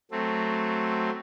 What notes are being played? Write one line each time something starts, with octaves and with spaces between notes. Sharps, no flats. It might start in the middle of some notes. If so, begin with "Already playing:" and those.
F#3 A3 C4